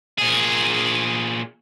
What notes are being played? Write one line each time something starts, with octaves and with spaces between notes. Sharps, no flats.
A#2 G#4